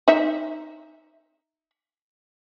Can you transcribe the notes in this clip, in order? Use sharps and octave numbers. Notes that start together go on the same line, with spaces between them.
D#4 E5